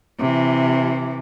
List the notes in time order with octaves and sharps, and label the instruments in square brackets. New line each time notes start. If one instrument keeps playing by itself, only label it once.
[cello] C3 E3